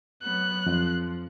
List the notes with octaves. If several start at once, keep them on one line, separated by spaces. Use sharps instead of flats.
F#3 B3 F#6
F2 F3